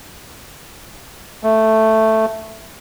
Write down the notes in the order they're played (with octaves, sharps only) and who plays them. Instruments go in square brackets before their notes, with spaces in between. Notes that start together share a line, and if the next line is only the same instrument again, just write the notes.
[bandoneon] A3